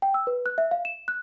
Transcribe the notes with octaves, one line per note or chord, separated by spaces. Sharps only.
G5
E6
B4
F#6
E5
F5
E7
F#6